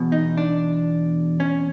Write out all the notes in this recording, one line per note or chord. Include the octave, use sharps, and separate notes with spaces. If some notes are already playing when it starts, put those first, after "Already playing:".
Already playing: E2 B2
D#4
D4
C#4